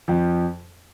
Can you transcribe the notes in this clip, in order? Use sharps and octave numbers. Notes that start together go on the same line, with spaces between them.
F2 F3